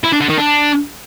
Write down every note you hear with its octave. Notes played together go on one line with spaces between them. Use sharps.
E4
D4
D3
D#3
D4